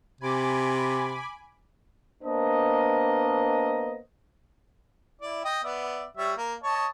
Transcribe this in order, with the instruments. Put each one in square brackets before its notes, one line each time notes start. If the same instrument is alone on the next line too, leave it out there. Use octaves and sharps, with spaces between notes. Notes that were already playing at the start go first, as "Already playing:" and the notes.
[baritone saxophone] C3 [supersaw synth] G#5 B5 D6
[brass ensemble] A#3 B3 D4 C5 D#5
[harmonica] E4 D5
D#5 G5
B3 D5 E5
G3 C#5 E5
A#3
C#5 D#5 A5